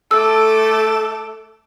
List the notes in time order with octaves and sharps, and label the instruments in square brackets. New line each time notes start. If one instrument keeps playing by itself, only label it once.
[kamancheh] A3 D6 [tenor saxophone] A4 [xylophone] E6